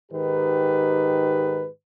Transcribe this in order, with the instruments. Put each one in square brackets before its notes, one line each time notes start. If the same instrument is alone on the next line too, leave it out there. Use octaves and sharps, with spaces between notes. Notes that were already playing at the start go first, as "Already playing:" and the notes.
[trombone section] G#2 D#3 G4 B4